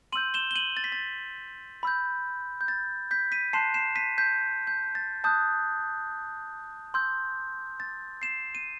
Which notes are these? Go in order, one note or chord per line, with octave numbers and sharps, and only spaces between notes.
C6 E6 G6 D#7 F#7
E7 G7
G7
D#7 F#7
A6
B6
A6
B5 E6 G6
G6
A6
G6 B6
B6 D#7
A5 C6 F#6 C7 E7
C7 E7
B6 D#7
G6 B6
G6
A6
A5 D#6 F#6 G6
C6 E6 G6
A6
C7 E7
D#7